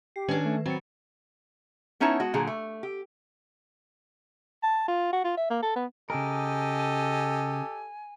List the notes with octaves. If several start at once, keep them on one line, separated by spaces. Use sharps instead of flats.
G4 C7
D#3 C#4 D4 B4 G#6
A3
F#3 C4 B5 A6 C#7
B3 C#4 D#4 E4 C#5 A5
G#3 F#4
A#2 D3 F#3 G#4
A3
G4
A5
F4
F#4
F4
E5
A#3
A4
B3
C#3 G4 A4 A#4 D#5 G#5